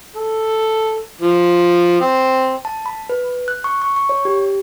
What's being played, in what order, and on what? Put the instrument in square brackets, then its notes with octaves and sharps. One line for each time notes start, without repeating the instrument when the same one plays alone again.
[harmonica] A4
F3
C4
[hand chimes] A5
B5
B4
F#6
C#6
C#6
C#6
C#5
G4